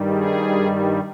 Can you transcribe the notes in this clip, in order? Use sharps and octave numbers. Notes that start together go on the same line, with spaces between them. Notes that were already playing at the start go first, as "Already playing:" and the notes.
Already playing: G2 D#3 G3
G#4